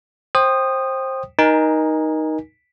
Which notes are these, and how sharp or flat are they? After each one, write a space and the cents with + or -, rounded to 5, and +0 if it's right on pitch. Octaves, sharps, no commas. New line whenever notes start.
C5 +20 G5 +0 D#6 -15
D#4 +0 A#4 +25 G#5 -15